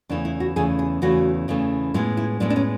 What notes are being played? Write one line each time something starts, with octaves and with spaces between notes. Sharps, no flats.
E2 C#3 E3 A3 D4
E4
F#4
E2 C#3 E3 A3 G#4
G#4
E2 C#3 E3 A3 F#4
E2 C#3 E3 A3
A2 G#3 B3 E4
E4
A2 G#3 B3 D4
D4
C#4